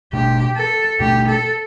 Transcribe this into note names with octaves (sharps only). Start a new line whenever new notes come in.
B2 A3 D4 G4
A4
B2 A3 D4 G4
A4